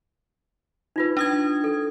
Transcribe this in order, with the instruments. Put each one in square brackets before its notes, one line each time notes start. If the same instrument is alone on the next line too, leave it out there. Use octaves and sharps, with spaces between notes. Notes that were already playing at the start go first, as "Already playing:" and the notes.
[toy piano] D#4 F4 B4
[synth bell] D4 D#6 G#6
[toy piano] A4